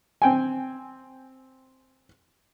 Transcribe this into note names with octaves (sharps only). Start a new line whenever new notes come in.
C4 G5 G#5